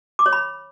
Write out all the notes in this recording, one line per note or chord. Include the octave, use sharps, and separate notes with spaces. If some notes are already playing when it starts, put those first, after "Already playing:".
D6
C#5
B5